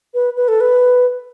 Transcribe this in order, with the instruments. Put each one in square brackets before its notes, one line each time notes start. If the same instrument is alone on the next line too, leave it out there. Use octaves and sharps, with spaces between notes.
[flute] B4
B4
A4
B4